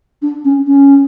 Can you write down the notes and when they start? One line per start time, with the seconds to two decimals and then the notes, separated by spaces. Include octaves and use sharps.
0.22 D4
0.45 C#4
0.67 C#4